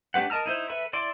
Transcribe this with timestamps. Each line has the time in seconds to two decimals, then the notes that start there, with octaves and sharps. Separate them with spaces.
0.14 A3 D4 G4 B4 F#5
0.30 A#4 D#5 A5 A#5 F6
0.46 D#4 E4 C5
0.70 A4 B4 E5 B5
0.93 E4 D5 C6 D6